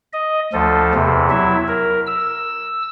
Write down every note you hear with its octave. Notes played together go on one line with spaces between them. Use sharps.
D#5
D2 F3 A4
E2 C3
F#3 E4 E5
A#4
E6